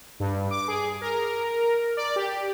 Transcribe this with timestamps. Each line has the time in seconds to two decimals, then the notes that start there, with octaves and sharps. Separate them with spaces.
0.20 G2
0.51 D6
0.68 G#4
1.01 A#4
1.97 D5
2.16 G4